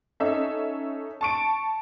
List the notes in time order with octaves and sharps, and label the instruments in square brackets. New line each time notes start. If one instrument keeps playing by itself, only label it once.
[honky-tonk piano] C#4 D#4 A4 E5
A5 C#6 D7